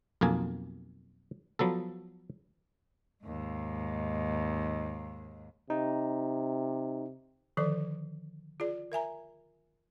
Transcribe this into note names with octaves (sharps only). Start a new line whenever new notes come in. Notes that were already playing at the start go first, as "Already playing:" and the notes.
B1 F2 A#3 G#5
F3 F#3 B3 A4
D#2 G#2
C3 D#4
D3 D#3 F3 A4 D5
F4 G#4 D5
A#4 E5 G#5 A#5